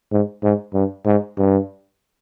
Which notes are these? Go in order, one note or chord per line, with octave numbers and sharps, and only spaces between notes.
G#2
G#2
G2
G#2
G2